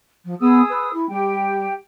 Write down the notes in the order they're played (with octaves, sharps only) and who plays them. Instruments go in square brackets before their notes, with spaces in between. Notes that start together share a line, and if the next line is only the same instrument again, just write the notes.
[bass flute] F3
[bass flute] B3 [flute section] G#4 D#6 E6
[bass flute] B4
E4
[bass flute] G3 [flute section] G4 G5